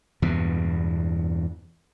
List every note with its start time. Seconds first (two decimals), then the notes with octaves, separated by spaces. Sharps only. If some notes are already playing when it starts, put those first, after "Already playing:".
0.22 E2 G2 B2